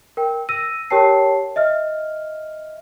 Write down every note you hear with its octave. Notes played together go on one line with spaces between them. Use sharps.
A#4 G5
E6 A#6 D#7
G4 A#4 C#5 G5 A5 C7
D#5 E5 F6